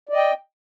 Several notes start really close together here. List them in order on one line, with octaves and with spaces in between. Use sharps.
D5 D#5 G5